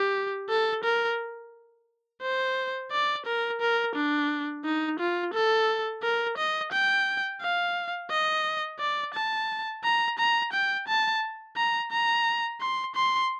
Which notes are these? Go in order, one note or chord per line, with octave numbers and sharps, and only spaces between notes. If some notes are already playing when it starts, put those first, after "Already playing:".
Already playing: G4
A4
A#4
C5
D5
A#4
A#4
D4
D#4
F4
A4
A#4
D#5
G5
F5
D#5
D5
A5
A#5
A#5
G5
A5
A#5
A#5
C6
C6